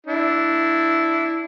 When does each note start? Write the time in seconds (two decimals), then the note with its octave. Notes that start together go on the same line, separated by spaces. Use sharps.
0.07 D4 E4